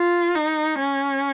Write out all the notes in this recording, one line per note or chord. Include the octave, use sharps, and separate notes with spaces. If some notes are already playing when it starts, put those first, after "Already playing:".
Already playing: F4
D#4
C#4